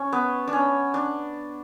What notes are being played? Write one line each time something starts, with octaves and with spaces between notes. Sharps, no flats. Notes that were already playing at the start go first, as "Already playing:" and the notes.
Already playing: C#4
B3
D4
C#4
D4